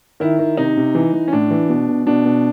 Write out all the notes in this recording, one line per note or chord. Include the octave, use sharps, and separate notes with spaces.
D#3 E4
D#3
C3 D#4
C3
E3
E3
C#4
A2 D4
E3
B2
B2
B2 D4
B2